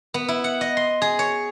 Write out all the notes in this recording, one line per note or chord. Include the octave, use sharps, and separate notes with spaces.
B3
E4
F#5
D#5
C6
G#4
C#5